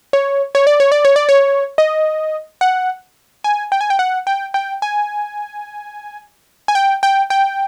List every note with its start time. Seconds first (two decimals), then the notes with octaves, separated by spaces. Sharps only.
0.13 C#5
0.55 C#5
0.67 D5
0.80 C#5
0.92 D5
1.05 C#5
1.16 D5
1.29 C#5
1.78 D#5
2.61 F#5
3.44 G#5
3.72 G5
3.81 G#5
3.90 G5
3.99 F#5
4.27 G5
4.54 G5
4.82 G#5
6.68 G#5
6.75 G5
7.03 G5
7.30 G5